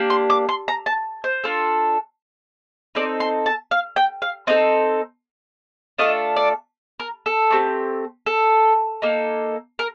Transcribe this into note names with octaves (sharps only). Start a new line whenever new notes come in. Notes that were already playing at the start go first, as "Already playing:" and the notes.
Already playing: A#3 D4 G4
C6
D6
C6
A#5
A5
C5
D4 F4 A4
C4 D#4 A4 D5
C6
A5
F5
G5
F5
C4 D#4 A4 D#5
A3 D4 F4 A4 D#5
D5
A#4
A4
A3 C4 G4
A4
A#3 D#4 A4
A#4